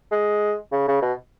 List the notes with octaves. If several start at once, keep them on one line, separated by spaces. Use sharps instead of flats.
G#3
C#3
C#3
B2